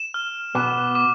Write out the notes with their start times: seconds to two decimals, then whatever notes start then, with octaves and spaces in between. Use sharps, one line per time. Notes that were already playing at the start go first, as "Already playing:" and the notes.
Already playing: E7
0.14 F6
0.55 B2 B3 D6
0.95 D6